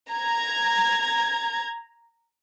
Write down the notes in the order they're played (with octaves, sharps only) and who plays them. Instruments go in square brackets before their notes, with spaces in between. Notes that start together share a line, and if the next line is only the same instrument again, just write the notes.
[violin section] A#5 G#6